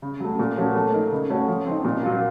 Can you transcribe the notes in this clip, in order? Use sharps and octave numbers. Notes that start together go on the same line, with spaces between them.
C#3
F#3 A3
A#2
F3 A3 C#4 F#4
A3
D#4 A#4
C#3
A3 C#4 F#4
F3
C4 D#4
A#2
F#3 A#3 F4